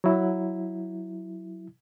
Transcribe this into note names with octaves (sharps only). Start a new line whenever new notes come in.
F#3 E4